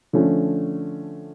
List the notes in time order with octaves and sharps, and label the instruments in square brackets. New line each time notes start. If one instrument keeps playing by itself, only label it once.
[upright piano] D3 F3 A3 C#4